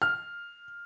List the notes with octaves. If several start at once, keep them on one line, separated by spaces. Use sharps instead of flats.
F6